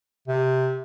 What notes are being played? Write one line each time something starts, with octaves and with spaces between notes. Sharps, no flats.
C3